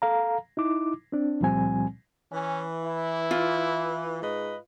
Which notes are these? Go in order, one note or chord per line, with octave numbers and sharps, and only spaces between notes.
A4 F5 A#5
D#4 E4 D6
C4 D4
C#2 A#2 F3 G3 C4 G#5
E3 C#4
E4
F4
G#2 B4 D#5